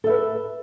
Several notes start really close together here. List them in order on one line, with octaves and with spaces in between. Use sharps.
A4 E5 B4